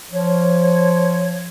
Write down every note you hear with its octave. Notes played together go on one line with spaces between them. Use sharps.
F3 C#5